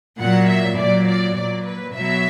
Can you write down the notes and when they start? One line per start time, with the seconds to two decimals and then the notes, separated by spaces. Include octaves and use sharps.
0.19 A#2 F#3 F#5
0.49 E5
0.78 A#2 F#3 D5
1.07 D5
1.36 A#2 F#3 D5
1.65 B4
1.94 B2 F#3 E5